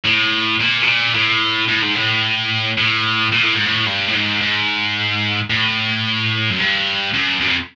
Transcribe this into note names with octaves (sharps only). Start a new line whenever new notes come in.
A2
A#2
B2
A#2
A2
A2
G#2
A2
A2
A#2
A2
G#2
A2
G2
A2
G#2
G#2
A2
F#2
G2
F#2
F#2
F2